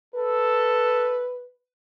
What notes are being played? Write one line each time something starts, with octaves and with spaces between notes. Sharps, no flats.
A4 B4